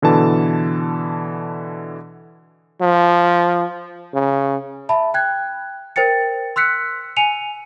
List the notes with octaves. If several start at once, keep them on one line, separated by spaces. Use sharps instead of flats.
B2 D3 E3 A5
F3
C#3
E5 A5 B5
G5 F#6 G#6
A#4 C5 G5 A6 C#7
C6 E6 F#6 B6 C#7
G#5 C#7 D#7 F7